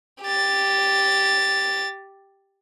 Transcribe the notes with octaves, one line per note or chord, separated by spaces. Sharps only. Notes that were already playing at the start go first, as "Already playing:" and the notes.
G4 A6